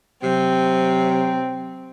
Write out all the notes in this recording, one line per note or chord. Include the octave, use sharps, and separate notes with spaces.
C3 F#3 C4